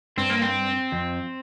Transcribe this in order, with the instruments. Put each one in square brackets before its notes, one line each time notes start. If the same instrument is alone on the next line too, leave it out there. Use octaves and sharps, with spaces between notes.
[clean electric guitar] G2 [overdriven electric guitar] C4
[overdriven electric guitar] A#3
C4
[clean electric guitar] F2